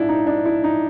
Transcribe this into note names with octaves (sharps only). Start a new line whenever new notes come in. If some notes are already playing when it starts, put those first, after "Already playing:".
Already playing: A#1 G#2 F3 D4 E4
D#4
D4
E4
D#4